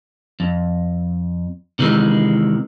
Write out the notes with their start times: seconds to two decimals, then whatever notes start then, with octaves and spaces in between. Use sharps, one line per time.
0.40 F2
1.79 C3 D#3 E3 G#3